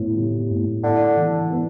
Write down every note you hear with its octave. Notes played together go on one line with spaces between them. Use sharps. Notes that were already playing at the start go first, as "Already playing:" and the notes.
Already playing: A2 B3
G3
A2
D3 E4
E3
B3